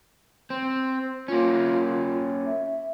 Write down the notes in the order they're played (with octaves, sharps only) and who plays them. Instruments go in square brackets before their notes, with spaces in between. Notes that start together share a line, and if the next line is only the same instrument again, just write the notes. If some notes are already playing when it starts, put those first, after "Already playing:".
[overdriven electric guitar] C4 [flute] C6
[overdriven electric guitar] A#3 C#4 [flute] F4
[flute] E5